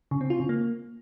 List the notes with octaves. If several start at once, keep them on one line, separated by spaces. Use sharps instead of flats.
C#3
C4
F4
C#3
A#3